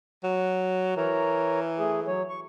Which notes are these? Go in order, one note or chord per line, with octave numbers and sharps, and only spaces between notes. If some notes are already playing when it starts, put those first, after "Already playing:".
F#3
E3 A#4 C#5 A#5
A3 G#4
F#3 C#5
C#6